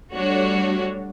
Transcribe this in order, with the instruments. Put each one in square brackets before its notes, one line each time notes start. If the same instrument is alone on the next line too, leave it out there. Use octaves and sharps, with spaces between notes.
[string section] G3 A3 D4 F#4 C#5